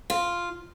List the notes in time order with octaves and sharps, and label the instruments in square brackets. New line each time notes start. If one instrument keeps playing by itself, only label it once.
[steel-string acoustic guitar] F4